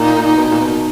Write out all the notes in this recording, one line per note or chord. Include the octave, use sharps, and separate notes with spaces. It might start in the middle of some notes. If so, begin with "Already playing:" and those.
Already playing: A#2 D#4
B2
A#2
B2